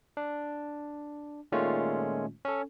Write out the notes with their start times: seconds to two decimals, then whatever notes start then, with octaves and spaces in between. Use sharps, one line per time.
0.17 D4
1.52 A#2 D#3 G#3 A3 C#4 F4
2.45 C#4 A4